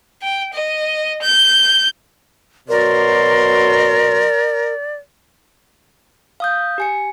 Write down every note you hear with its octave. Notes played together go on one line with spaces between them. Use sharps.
G5
D#5
G6
B2 F#3 A#4 D5 C6
F5 D#6 G6
G4 G#5 C#7